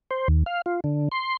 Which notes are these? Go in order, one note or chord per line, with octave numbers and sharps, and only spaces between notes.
C5
D#2
F5
F4
D3
C6